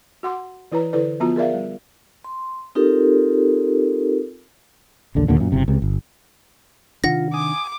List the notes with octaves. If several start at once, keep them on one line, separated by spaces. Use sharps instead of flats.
F#4 F#5 C6 D6
E3 E4 B4 C#5 A#5
D3 E4 A4 B4 D5
F3 B3 F4 F#4 A#5
G#4 A#4 D5 E5 F5
G3
C6
C4 D#4 F4 G4 A4 A#4
A#1 D#2 D3
D#2 A#2 D3
F#2 A#2
F#1 C3
C#2 C3
G1
C3 D#3 D4 F4 F#5 A#6
G#5 D6 D#6